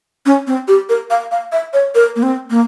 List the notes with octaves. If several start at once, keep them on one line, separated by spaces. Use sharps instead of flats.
C#4
C4
G4
A#4
F5
F5
E5
C#5
A#4
A#3
C4
A#3